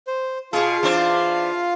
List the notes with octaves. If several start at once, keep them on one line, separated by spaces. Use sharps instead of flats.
C5
B2 F4 G#4 F5
E3 D4 C5